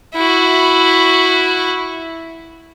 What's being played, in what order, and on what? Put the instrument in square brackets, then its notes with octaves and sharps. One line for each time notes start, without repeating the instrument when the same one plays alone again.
[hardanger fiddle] E4 F#4